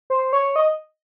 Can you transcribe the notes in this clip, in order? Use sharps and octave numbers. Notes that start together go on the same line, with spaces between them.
C5
C#5
D#5